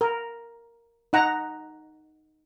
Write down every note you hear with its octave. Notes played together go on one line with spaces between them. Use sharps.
A#4
D#4 F#5 A#5